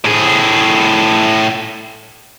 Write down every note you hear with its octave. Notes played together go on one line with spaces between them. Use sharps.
A2 G#4